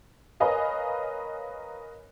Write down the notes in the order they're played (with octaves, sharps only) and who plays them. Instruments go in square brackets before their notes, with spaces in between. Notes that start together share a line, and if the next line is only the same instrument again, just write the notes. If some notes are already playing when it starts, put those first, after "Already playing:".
[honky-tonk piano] A#4 B4 C#5 D#5 F5 G#5